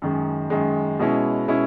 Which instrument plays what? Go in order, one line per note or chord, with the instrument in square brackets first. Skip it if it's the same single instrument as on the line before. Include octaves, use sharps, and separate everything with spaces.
[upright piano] F#2 D#3 G#3
F#2 D#3 G#3
B2 G#3 C#4 E4
B2 G#3 C#4 E4